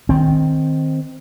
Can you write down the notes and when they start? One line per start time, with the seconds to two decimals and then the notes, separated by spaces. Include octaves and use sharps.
0.09 D#3 C4